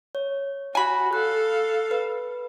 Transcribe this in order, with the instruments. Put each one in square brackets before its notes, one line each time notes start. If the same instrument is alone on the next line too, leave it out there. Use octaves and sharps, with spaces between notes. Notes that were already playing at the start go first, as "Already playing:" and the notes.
[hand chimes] C#5
[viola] F#4 [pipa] G#5 B5
[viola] A4 F5 [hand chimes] F#6
[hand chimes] B4